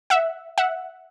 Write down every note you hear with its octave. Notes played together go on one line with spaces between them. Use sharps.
E5 F#5
E5 F#5